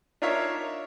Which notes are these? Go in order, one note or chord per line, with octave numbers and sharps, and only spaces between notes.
D4 D#4 F4 A#4 C#5 E5